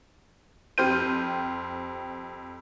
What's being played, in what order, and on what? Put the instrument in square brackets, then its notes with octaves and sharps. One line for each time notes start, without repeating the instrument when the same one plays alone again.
[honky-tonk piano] F2 G4 C5 F6 G6 D#7